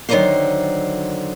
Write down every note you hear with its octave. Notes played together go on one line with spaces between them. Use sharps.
D3 D#3 F3 F#3 A#3 C5